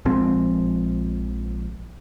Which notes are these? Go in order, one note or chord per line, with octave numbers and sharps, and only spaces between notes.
A#1 F3 G#3 C4